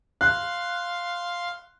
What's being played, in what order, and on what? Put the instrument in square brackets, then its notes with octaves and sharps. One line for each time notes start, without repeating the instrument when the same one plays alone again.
[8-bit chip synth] F5 C6 [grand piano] F#6